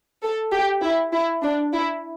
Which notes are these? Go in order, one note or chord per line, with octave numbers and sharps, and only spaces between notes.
A4
G4
E4
E4
D4
E4